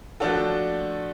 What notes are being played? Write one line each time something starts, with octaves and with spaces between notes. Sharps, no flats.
F3 A3 D4 F#4 A4